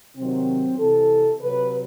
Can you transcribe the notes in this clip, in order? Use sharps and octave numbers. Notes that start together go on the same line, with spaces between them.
C3 D#3 F#3 C4
C3 E3 A4
C3 F#3 B4